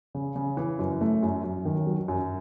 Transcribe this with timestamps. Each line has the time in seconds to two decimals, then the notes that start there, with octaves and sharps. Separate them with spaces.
0.15 C#3
0.36 C#3
0.57 E3
0.79 F#2
1.01 A3
1.23 F#2
1.44 F#2
1.65 D#3
1.87 F#3
2.08 F#2